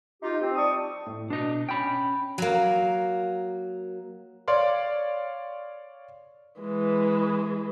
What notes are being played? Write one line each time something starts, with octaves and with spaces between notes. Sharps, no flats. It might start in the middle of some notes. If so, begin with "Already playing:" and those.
D#4 F4 G4
C4
G3 D5 A5 C#6 D#6
A2
B2 D4 D#5
C#4 G5 B5
F#3 A#3
C#5 D5 F5 C6
E3 G#3